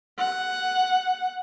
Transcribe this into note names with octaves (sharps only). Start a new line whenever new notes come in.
F#5